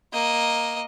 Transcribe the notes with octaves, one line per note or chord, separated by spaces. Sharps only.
A#3 D#5